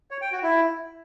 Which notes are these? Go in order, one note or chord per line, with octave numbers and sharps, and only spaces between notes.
C#5
G5
F#4
E4